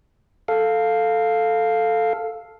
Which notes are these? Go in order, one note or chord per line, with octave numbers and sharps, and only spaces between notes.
A4 F5